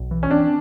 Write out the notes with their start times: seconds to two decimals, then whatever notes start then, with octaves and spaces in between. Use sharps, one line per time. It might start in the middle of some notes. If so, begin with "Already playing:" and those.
Already playing: B1
0.11 E3
0.23 C#4
0.30 C4 D4